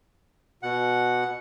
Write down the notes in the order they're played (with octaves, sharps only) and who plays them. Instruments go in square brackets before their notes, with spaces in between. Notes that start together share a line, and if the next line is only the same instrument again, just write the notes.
[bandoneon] B2 F#5